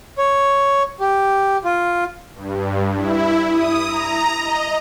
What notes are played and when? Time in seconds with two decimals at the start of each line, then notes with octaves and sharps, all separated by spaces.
0.18 C#5
1.00 G4
1.64 F4
2.34 G2
2.96 E4
3.51 D#6
3.86 A#5
4.38 D#5